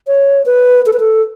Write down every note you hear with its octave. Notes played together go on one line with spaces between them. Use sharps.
C#5
B4
A4
B4
A4